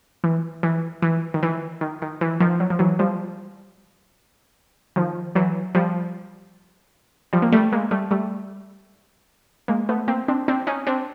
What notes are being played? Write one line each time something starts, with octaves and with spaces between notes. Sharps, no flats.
E3
E3
E3
D#3
E3
D#3
D#3
E3
D#3 F3
F#3
F3
E3 F#3
F3 G3
D#3 F3
E3 F#3
F3 G3
F3 G3
A#3
G3 A3
G#3 A#3
G3 A3
G3 A3
G#3 A#3
A3 B3
A#3 C4
C4 D4
C4 D4
C#4 D#4
C4 D4